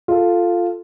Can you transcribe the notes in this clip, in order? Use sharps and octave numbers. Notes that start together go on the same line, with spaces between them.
F4 A4